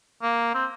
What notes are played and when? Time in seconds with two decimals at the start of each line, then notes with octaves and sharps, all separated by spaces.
0.23 A#3
0.54 C4